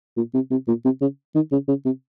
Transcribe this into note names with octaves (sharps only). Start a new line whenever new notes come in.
A#2
C3
C3
A#2
C3
C#3
D#3
C#3
C#3
C3